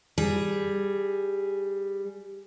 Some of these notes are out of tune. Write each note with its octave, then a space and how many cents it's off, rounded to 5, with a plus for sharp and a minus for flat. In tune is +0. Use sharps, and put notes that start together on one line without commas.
G3 +10 G#4 +0